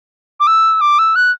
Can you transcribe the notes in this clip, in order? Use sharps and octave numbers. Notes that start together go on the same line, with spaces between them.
D6
E6
D6
E6
F#6